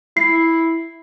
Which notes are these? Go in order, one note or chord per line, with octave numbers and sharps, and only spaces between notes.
E4 C7